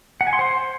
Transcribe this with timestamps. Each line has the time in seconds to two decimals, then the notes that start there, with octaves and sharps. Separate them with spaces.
0.21 F#5
0.27 G#5
0.33 C6
0.39 C5